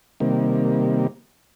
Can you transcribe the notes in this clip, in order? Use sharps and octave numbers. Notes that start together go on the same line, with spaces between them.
C3 D#3 G3 A#3